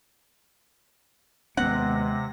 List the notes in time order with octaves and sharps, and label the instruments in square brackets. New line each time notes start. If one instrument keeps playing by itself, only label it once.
[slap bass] D#2 B3 C#4 [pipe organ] C3 A#6 [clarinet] G#3 [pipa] F#5